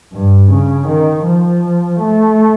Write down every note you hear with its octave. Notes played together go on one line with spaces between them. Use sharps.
G2
C#3
D#3
F3
A3